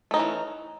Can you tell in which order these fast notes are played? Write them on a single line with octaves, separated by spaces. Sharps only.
A3 D#4 C#4 E3